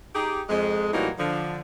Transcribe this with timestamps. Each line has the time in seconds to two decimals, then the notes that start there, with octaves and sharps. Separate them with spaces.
0.15 D#4 G4 G#4
0.50 F2 G#3
0.93 A2 E3 F#3 G3 A#3 D#4
1.19 D3 F3